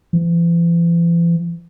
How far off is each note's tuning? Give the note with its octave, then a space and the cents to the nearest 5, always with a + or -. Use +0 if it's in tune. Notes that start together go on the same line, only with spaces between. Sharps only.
E3 +45